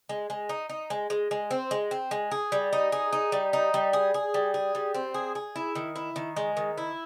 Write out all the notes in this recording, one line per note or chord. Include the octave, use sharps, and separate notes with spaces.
G#3
G#3
D#4
D#4
G#3
G#3
G#3
C4
G#3
C4
G#3
G#4
G3
D#4
G#4
D#4
G3
D#4
G3
G#4
G#4
G3
G#4
G3
C4
G#4
G#4
E4
D#3
E4
D#3
G#3
D#3
E4